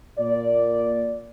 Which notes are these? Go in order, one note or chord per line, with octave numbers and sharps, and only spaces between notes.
A#2 D5